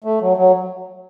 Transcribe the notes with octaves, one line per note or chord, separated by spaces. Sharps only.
A3
F#3
F#3